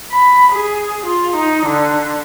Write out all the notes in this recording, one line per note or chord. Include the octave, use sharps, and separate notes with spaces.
B5
G#4
F4
D#4
D3